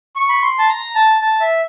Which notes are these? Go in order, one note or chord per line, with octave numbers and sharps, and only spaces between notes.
C#6
B5
C6
A5
A#5
A5
A5
E5